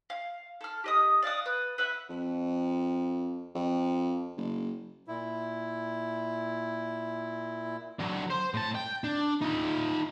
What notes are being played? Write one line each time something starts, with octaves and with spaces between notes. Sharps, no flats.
F5
A4 F6
G4 D#5 D#6
D5 F5 F#5 D#6
B4
B4 E5 F#5
F2
F2
F#1
A#2 E4
D3 F#3
C5
A2 A5
G5
D4
D#4 F4